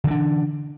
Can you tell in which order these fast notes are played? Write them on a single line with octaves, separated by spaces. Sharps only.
D3 E3 D4